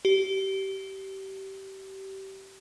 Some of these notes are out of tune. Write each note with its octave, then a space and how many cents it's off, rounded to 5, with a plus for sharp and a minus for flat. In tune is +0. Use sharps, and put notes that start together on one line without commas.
G4 -25